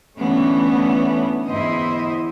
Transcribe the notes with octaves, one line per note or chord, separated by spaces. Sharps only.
D3 E3 A3 B3 C#4
E2 E4 C5 D#5